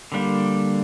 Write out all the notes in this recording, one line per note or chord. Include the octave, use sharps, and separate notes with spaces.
D3 G3 A#3 D4